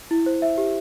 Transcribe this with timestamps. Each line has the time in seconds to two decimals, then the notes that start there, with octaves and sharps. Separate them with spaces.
0.11 E4
0.26 C5
0.42 E5
0.58 G4